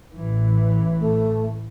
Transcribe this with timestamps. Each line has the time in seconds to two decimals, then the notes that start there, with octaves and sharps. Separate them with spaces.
0.13 A1 E3
0.99 A3